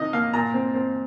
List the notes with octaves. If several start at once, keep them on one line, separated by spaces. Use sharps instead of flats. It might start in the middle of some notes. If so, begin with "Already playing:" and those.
Already playing: C3 D#4 D#5
A#3 F5
A#2 A#5
C4
C4